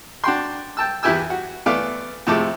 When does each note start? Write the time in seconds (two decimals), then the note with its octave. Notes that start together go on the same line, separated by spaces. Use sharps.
0.24 D4 F#4 G5 C6
0.77 G5 A5 E6
1.03 E2 E3 E4 G4 G#5 E6
1.30 F#4
1.66 E3 A3 B3 D5 F5
2.27 F2 A2 C3 G#3 A4 D6